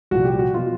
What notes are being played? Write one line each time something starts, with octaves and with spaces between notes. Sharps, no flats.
C2 A#2 F3 F#4
G4
F#4
B2 F#3 F4